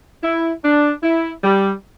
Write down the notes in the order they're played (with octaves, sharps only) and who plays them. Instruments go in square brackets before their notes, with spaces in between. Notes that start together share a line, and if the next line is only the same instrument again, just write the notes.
[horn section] E4
D4
E4
G3